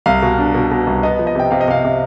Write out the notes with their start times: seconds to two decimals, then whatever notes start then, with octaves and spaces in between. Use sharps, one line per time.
0.06 C2 F5
0.22 B2
0.38 D4
0.54 B2
0.71 B2
0.87 C2
1.03 B3 D#5
1.19 F3
1.27 D#5
1.35 C3 G5
1.51 C3 F5
1.61 D#5
1.68 C3 F5
1.85 C3